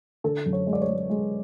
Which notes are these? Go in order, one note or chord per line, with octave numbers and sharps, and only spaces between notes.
D3 A4
F#2
C#5
G#3
D5
C#5
G#3
G#3